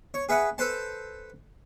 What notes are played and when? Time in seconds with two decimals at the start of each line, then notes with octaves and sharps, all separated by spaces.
0.14 C#5
0.29 G#4 B4 E5 F#5
0.58 A4 B4 C5 A5